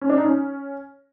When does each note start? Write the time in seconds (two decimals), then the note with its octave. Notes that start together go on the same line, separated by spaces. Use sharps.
0.01 C#4
0.09 D4
0.17 D#4
0.25 C#4